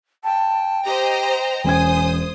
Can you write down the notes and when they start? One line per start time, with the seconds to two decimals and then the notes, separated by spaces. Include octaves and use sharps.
0.24 G5 A5
0.85 G4 C5 D#5 A#5
1.64 E1 C#4 C5 G#5 D#6 G#6